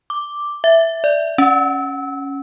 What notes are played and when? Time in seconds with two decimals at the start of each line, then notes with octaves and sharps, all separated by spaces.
0.10 D6
0.64 E5
1.04 D5
1.38 C#4